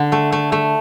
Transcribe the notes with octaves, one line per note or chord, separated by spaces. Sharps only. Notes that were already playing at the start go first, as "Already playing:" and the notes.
Already playing: D3
A3
A3
A3